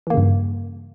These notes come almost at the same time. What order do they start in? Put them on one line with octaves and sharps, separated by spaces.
E3 A#3 C#3 G2